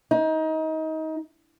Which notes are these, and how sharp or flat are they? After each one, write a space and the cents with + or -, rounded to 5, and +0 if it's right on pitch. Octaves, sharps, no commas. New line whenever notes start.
D#4 +25